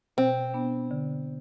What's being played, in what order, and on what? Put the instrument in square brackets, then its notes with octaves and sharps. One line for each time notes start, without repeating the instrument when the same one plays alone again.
[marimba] B2 [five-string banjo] C4
[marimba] B3 D4
D3